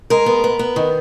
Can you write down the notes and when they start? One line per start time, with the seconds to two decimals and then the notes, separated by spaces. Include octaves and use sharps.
0.10 G#3 A#4
0.26 B3
0.44 B3
0.59 B3
0.76 D#3